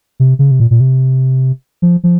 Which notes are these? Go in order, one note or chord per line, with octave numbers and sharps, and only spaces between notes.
C3
C#3
C3
A#2
A#2
C3
F3
F3